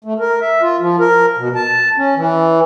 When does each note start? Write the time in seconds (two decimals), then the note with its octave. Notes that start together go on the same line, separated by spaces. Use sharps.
0.04 A3
0.19 A#4
0.41 E5
0.62 F4
0.80 F3
1.00 A#4
1.38 B2
1.56 A5
1.97 C#4
2.16 E3